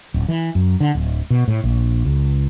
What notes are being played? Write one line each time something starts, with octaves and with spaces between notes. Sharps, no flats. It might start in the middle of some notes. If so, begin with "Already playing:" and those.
D1
E3
F#2
D3
D1
B2
A2
A#1
C#2